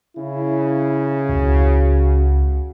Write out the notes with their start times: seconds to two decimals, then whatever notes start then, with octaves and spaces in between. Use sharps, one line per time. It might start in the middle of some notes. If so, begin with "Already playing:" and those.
0.17 C#3 E4
1.29 C#2 F#4